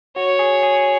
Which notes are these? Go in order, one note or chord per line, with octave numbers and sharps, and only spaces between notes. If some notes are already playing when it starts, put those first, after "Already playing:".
F#4 C#5
G#4
G#4